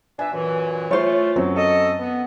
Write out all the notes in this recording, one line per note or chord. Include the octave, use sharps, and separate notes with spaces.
D4 B4 E5 G#5
F#2 A#2 E3
A3 F4 C5 C#5
F#2 F#3 C4
A4 D#5
B3